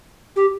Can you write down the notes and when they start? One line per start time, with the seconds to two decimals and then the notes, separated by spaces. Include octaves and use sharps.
0.36 G4